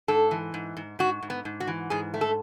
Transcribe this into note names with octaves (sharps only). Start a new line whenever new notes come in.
G#2 A4
E3
G#2
G#2
G#2 F#4
G#2
B3
G#2
F#4
E3
G#2 G#4
A3
A4